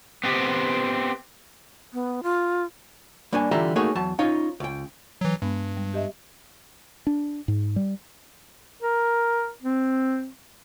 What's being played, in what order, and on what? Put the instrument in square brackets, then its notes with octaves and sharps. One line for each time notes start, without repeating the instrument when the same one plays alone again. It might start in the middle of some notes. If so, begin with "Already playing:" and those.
[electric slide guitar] B3 C4 G4
[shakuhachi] B3
F4
[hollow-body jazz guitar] G3 A#3 D4 C#5 G#5
D3 E3 G3 F4 E5 A#5
A3 A#3 D#4 F#4 G#4 C#5
E2 F#3 A5
C#4 D#4 F4 C#5 F5
C#2 G5
[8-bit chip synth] E3 F#3
[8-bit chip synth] G2 [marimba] G#3 B3
[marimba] G3
G4 D#5 E5
[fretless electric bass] D4
G#2
G3
[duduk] A#4
C4